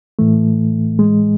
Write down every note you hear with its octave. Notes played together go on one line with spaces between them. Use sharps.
A2 E3 A3
G#3